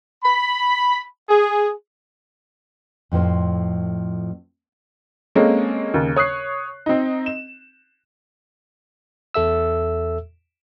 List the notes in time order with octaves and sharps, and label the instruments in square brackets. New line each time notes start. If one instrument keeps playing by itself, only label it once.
[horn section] B5
G#4
[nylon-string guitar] F2 A2 F3 C5
[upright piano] G#3 A#3 C4 C#4 G#4 A4
D#2 C#3
C#5 D#6 F#6 C7
C4 D#4
E7
[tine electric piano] E2 A4 E5 E6